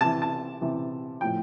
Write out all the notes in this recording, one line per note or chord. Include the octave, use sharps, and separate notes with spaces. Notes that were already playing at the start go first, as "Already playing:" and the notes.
C3 E3 A5
A5
C3 E3
A2 F3 G5